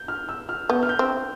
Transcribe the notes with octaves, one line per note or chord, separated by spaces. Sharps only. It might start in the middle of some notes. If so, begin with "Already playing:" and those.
Already playing: G6
F6
E6
F6
B3 G6
F6
G6
C4